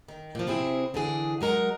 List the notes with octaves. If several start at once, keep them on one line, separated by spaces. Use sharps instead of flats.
D#3
A#2 F3
C3 C4 E4 G#4
D3 E3 G#4
F#3 G#3 A#4 F#5